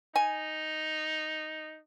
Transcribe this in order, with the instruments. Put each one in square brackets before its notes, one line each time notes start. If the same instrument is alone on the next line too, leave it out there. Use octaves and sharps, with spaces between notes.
[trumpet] D#4 [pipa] G#5